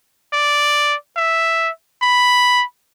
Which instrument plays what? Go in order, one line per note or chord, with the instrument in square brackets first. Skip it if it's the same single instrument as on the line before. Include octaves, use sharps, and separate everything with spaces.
[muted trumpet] D5
E5
B5